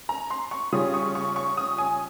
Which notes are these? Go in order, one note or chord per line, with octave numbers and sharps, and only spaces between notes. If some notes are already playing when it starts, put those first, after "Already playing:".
A#5
C6
C#6
C#3 G3 C#4 F4 D#6
C#6
C#6
C#6
D#6
G#5